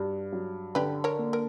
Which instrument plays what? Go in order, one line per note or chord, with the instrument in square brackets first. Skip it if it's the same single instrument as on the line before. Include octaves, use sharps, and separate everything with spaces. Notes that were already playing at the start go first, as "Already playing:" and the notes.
Already playing: [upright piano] G2 [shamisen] F#4
[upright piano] F#3
[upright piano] D3 [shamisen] G4 B4
[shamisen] A#4 C#5
[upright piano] A#3
[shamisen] A#4